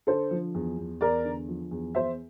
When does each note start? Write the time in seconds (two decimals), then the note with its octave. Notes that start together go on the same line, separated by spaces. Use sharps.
0.07 D3 A4 C5
0.31 F3
0.55 E2
0.78 E2
1.01 E2 A#4 D5
1.25 D3
1.49 F3
1.71 E2
1.95 E2 C5 E5